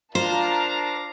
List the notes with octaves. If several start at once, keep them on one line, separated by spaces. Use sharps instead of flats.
D4 F4 A#4 C5 F5 A5 A#5